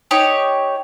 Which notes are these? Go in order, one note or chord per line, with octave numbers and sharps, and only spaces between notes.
D#4 G4 C#5 D#6